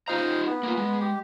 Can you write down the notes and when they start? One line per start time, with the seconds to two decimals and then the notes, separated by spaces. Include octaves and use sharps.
0.08 D#4 F4 C5 D#5 F5 A#5
0.47 B3
0.63 A#3 F4
0.77 G#3
1.01 G4